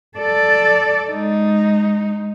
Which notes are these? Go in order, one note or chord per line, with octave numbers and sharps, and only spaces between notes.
A4 D5
G#3 D#4